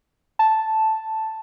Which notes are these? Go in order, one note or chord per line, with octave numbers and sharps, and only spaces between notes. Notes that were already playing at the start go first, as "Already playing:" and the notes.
A5